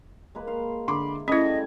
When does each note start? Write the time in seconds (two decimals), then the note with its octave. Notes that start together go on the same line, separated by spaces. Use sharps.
0.35 G#3 A#3 B4
0.47 F5 C6
0.88 D3 E4 B5 C6 D6
1.28 G3 A3 C#4 E4 G#4 D#5 D#6 G#6